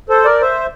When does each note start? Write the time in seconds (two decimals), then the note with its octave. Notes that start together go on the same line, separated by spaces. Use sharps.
0.09 A4 C5
0.25 A#4 D5
0.41 C5 E5